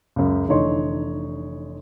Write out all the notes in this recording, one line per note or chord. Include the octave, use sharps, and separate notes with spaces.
C#2 F#2
F1 D3 E3 D#4 C#5 C6